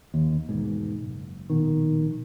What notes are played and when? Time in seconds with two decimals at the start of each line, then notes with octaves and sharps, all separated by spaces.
0.14 D#2
0.49 E1 G#2 B2
1.02 F#1
1.50 A#1 B2 D#3